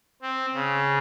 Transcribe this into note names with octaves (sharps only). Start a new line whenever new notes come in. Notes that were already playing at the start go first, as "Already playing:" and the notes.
C4
C#3